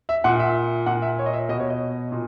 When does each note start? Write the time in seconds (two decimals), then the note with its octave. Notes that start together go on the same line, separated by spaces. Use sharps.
0.09 E5
0.24 A#2 F#5
0.39 E5
0.86 A#2 F#5
1.02 E5
1.19 C#5
1.26 D#5
1.33 E5
1.49 B2 D#5
1.60 C#5
1.70 D#5
2.12 A#2